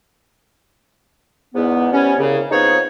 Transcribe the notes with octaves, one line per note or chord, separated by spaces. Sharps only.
E2 G#2 B3
F3 G3 B3 C#4
C2 C#3
B3 C4 D#4 F4 G#4 C#5